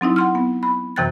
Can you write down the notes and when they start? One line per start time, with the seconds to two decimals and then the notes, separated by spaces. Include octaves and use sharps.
0.01 F#3 C4 D#4 E4
0.16 F#5 C6 F6
0.35 B3
0.63 B5
0.96 F#2 C3 E3 G5 F#6 A6